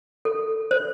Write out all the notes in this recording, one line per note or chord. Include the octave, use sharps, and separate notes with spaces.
A4
C5